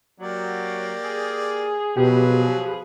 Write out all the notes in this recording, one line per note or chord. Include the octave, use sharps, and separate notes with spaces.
F#3 A#3 G4 D5
G#4
B2 F3 F#3 G4 G#4 B4